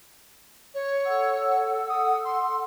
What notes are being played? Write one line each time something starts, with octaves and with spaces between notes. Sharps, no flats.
C#5
A4 F#5 E6
D#6
C6